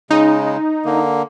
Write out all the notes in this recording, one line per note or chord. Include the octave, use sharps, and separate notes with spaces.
C#3 G#3 D#4
D3 A#3